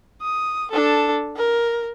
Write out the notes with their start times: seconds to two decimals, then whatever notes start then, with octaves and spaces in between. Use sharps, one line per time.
0.21 D#6
0.71 D4 A4
1.37 A#4